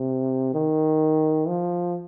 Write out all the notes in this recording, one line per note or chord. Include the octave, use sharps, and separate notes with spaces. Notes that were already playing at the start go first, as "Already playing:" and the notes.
Already playing: C3
D#3
F3